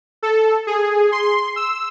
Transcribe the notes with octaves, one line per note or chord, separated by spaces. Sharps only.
A4
G#4
C6
E6